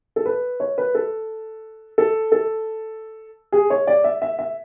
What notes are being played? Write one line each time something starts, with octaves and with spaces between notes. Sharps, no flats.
A4
B4
C#5
B4
A4
A4
A4
G#4
C#5
D5
E5
E5
E5